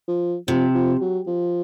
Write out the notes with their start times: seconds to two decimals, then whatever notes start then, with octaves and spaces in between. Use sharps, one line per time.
0.08 F3
0.48 C3 F3
0.74 F3
1.01 F#3
1.27 F3